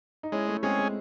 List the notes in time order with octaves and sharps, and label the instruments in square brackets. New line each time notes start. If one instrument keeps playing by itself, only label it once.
[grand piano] D#4
[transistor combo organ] G#3 [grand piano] C#4 E4
[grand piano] A3 C#4
[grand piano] G#3 C4 [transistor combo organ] C#4 G#4
[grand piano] G#3